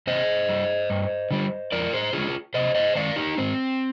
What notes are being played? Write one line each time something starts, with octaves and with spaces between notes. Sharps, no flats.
C3 C5 D#5
G3
G2
D3 G3
F2 A#4 D5
G#4 C5
D3 G#3 F4 G#4
C3 C5 D#5
C5 D#5
D#3 G#3 D5 F5
D#4 G4
G#2 C4